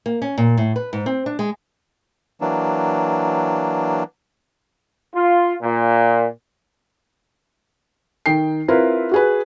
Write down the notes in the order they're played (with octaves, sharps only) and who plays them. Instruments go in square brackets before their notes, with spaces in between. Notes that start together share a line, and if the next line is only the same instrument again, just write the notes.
[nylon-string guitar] A#3
C#4
A#2
A2
B4
G#2
C4
D4
G#3
[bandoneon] E3 F#3 A#3 D4
[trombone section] F4
A#2
[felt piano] D#3 D#4 G5 C7
C4 E4 F4 A#4 B4
F#4 G#4 B4